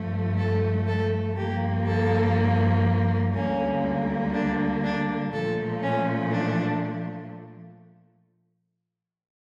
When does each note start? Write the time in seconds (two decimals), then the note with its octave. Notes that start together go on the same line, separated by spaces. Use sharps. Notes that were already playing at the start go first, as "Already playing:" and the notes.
Already playing: G2 F3 A3
0.37 A4
0.87 A4
1.36 G2 F3 A#3 G4
1.85 A4
3.34 D2 D3 G3 A#3 C#4
4.32 D4
4.83 D4
5.32 A#2 F3 A3 A4
5.82 C#4
6.31 D4